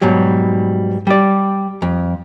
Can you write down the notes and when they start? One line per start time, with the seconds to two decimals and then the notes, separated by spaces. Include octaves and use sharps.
0.01 G#2 B2 F#3 G3
1.07 G3 D5
1.82 F2